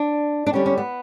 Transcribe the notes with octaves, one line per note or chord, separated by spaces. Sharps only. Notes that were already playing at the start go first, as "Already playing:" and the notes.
Already playing: D4
D4
D3 G3 B3 C#4
C#4
B3